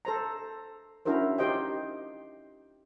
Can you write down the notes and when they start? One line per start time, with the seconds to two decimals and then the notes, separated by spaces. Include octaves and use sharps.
0.05 A4 C5 A#5
1.05 C#4 D4 E4 F#4 A#4 C5
1.38 D#4 F4 G4 C5 D#5 G5